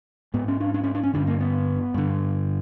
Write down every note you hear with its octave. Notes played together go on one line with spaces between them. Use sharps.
G#2 B3
C#4
D4
D4
C#4
D4
C#4
G2 D3 D4
A#3
B3
G2 D3